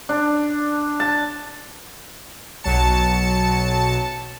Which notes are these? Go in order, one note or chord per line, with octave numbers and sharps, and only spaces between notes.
D4
A5
B1 F#3 A5 C#7